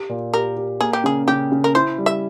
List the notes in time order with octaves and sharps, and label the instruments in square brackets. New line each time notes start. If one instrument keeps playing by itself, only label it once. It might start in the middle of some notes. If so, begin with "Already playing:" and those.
Already playing: [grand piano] G4
A#2
[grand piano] G4 [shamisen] A#4
[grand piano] G4
[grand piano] A#3 [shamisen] G#4
[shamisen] G4
[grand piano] C#3 [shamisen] G#4
[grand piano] C#3 [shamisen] G4
[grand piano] C#3
[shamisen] A#4
[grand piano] E4 [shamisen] C5
[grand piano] G3
[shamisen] E5